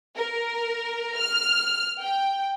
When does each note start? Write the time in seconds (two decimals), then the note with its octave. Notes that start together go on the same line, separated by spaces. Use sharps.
0.16 A#4
1.17 F6
2.02 G5